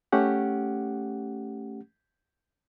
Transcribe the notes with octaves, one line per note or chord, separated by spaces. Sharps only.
A3 C#4 G4 F#5